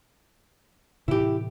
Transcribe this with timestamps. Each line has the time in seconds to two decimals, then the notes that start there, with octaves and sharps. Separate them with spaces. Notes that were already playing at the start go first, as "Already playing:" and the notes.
1.08 A2 C3 E3 E4 G4